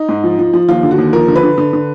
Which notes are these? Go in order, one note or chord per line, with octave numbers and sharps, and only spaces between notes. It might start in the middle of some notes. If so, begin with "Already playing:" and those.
Already playing: D#4
G#2
F3
F3
F3
D#2 F4
D3
F#4
D#2
F3 A#4
D3
B4
D3
D3
D3